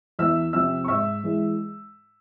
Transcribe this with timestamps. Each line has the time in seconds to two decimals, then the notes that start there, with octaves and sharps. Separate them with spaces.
0.19 E2 E5 E6
0.53 C3 F3 C4 E5 E6
0.84 C#6
0.88 G#2 E5 E6
1.24 E3 G#3